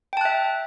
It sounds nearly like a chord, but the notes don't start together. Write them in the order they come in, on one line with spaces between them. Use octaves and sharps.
G5 A5 F#6 E5